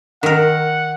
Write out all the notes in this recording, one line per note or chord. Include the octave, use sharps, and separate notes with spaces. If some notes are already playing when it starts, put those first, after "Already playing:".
D#3 A#4 F#5